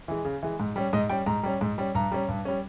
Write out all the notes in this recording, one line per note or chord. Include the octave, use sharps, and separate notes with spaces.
E3 G#3
C#3
E3 G#3
G#2
G3 C#4
G#2 D#5
G3 C#4 G5
G#2 A#5
G3 C#4
G#2
G3 C#4
G2 A#5
G3 C#4
G2
G3 C#4